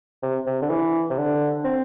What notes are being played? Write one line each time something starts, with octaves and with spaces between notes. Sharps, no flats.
C3
C3
D3
E3
C3
D3
C4